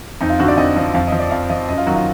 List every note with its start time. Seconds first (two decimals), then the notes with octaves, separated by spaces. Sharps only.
0.21 F2 D#4
0.30 F4
0.39 D3 F3 F#4
0.48 D5
0.57 F2 D#5
0.76 D3 F3
0.94 F2 F5
1.07 F3 D#5
1.19 D5
1.31 F2 F5
1.49 F3 D#5
1.69 F#2 D#5
1.78 F4
1.87 D#3 F#3 F#4
1.96 F4